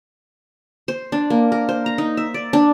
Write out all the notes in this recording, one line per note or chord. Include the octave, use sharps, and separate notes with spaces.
C5
D4
A#3
A#4
C5
A#5
D#4
E5
D5
D4